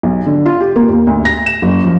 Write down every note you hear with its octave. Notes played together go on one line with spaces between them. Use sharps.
B1
D3
F4
G4
A#3
D#2
D2
A#6
E7
F#1
F3